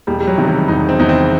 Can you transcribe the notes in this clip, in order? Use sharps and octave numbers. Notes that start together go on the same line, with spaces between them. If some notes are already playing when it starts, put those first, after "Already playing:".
E1 G3
G3
F#3
E2 C3 D#3
G3
E1 D#4
C4
E2 C3 D#3 D#4
C4